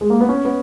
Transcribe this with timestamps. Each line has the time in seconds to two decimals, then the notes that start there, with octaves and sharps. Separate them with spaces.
0.01 G#3
0.10 A#3
0.20 B3
0.29 C#4
0.45 B3